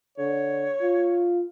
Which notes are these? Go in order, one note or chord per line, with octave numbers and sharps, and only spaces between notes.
D3 C#5
F4